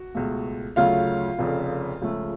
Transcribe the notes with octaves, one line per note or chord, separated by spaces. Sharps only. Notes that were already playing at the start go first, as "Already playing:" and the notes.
Already playing: F#4
C#2 B2 A3
D2 C#3 F#3 A3 F4 F5
F1 F2 C#3
C#2 C#3 F3 A3